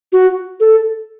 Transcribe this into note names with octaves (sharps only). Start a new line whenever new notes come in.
F#4
A4